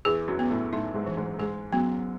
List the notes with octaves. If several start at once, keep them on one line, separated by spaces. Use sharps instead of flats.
E2 E3 G#4
F#2 F#3
B3
A2 A3
A2 A3 D#4
G#2 G#3
E3
G#2 G#3
G#2 G#3 G#4
F#2 F#3 B3